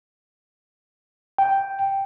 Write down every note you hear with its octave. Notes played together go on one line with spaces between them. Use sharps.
G5